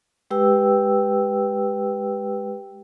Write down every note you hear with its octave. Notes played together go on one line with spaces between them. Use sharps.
G#3 G4 B4 G5 E6